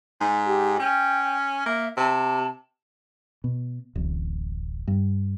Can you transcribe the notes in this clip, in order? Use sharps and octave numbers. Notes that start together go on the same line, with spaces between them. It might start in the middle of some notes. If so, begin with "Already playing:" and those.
G#2
G4
C#4 G5
A#3 E5
C3 A5
B2
D1 A1
G2